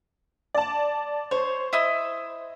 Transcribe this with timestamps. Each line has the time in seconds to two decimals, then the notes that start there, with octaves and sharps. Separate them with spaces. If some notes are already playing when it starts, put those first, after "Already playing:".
0.54 D5 A5
1.31 C5 C#5
1.73 E4 D#5 E6